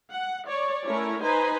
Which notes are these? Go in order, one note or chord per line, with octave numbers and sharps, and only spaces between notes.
F#5
C#5 D5
A3 C#4 E4 A#4 C#5
D#4 B4 C5 G#5 A#5